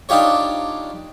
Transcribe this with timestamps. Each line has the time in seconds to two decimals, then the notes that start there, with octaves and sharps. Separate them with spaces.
0.09 D4 D#4 F4 G4 C#5